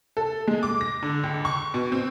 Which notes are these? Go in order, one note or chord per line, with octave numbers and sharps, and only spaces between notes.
A4
G#3
D6
A#6
D3
C#2
C#6
B2
C4